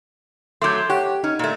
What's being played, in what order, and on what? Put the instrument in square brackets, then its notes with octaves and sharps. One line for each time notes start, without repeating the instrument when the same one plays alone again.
[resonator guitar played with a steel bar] F#3 A3 [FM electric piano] C6 D6 G6
[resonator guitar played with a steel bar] G4 [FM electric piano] C#5 F#5
[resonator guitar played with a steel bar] C#4 [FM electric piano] D#4
[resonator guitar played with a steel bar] A#2 A3